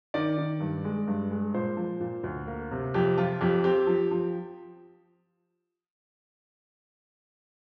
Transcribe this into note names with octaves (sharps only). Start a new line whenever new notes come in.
D#3 D5
D#3
G2
G#3
G2
G#3
A#2 C5
F3
A#2
D2
A#3
C3
F2 G4
F3 F4
F2 G4
C4 G4
F3
F3